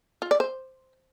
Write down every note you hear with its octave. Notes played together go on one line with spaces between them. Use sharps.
F4
D5
C5